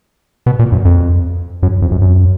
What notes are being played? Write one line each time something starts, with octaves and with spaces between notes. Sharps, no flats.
B2
A#2
F#2
F2
F#2
F2
F#2
F#2